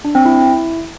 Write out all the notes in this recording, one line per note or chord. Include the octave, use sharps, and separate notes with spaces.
D4
C4
E4